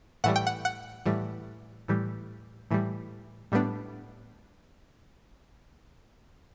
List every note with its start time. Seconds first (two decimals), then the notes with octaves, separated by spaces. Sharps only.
0.24 A2 E3 G3 F#5
0.36 G5
0.47 F#5
0.65 F#5
1.06 A2 E3 G3
1.88 A2 E3 G3
2.71 A2 E3 G3
3.52 A2 G3 B3 D4